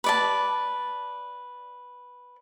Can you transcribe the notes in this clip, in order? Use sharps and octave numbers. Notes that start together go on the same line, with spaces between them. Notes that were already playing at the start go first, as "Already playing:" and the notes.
B4 D5 A5